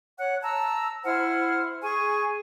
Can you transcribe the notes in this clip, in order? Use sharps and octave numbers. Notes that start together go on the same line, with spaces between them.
C#5 F#5 F#6
A5 A#5 E6
E4 C5 F#5 F6
G#4 G#5 C#6